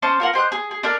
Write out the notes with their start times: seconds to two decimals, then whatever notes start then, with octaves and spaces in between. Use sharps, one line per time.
0.02 C#4 C5 A5 D6
0.20 F4 A#4 F#5
0.33 G4 C5 D#5 F#6
0.52 G#4
0.71 G#4
0.83 D4 A4 A#4 D5